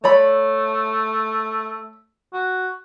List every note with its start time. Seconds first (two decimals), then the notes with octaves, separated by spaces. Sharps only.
0.04 A3 C#5 D5 B5
2.33 F#4